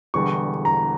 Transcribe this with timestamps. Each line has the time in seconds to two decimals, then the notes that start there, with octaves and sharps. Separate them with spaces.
0.14 E1 E2 D3 G3 C#6
0.65 A#5